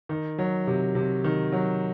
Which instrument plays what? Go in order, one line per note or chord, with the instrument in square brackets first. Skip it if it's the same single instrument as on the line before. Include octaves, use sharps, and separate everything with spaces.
[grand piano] D#3
F#3
C3
C3
D#3
F#3